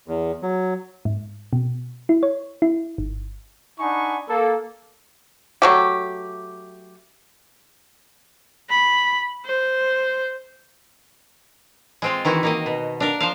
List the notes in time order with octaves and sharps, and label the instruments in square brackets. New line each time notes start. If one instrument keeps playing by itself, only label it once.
[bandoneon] E2
F#3
[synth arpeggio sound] G#2
B2
E4
C#5
E4
G1
[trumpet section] D4 D#4 F#5 G#5 B5 C#6
A#3 A4
[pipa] F#3 A3 G4
[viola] B5
C5
[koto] G#3 C4 F4
D#3 E3 E4 F#4
D#3 A#3 D#5
B2
D4 A#4 F5
F3 C5 F5